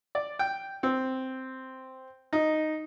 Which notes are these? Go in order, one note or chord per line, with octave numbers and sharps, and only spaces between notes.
D5
G5
C4
D#4